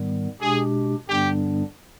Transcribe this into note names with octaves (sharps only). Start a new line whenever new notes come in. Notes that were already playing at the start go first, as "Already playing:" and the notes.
Already playing: G#2 D#3 G3 B3
B2 G#3 D4 G4 G#4
G2 D3 G3 B3 D4 G4